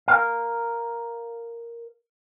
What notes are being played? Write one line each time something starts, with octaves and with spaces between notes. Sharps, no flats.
A#4 F5